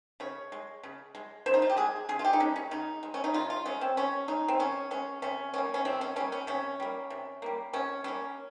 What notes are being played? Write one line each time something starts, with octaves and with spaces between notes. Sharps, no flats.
C#3 C#5
G#3
C#3
G#3
C#3 C5
D#4
F4
G4
G#3 G#4
C#3 G#4
F4
G4
D#4
G#3 C#4
C#4
C#3 D#4
G#3
C#4
D#4
C#3 F4
F4
G#3 C#4
C4
C#3 C#4
G#3 D#4
C4
C#3 C#4
G#3 C#4
C3 C#4
G3 A#3 C#4
C#4
C3 C4
C#4
G3 A#3 C#4
C#4
C3 C#4
G3 A#3
C3
G3 A#3
C3 C#4
G3 A#3 C#4